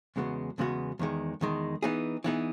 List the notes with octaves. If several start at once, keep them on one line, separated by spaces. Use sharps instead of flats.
E2 C#3 G#3 B3 F#4
E2 C#3 G#3 B3 F#4
E2 D#3 G#3
E2 D#3 G#3
E3 B3 D#4 G#4
E3 B3 D#4 G#4